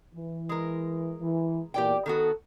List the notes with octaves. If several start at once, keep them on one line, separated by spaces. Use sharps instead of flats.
E3
G#3 A#4
E3
E2 A#2 G4 D5 G5
D#3 B3 F#4 A4